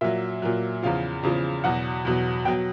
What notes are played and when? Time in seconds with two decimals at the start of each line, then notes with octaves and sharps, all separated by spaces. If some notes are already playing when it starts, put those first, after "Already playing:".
0.01 A#2 F#3 E5
0.42 A#2 F#3
0.83 E2 C#3 F3 F5
1.23 E2 C#3 F3
1.64 E2 B2 F#3 F#5
2.05 E2 B2 F#3
2.45 B2 G5
2.48 F#3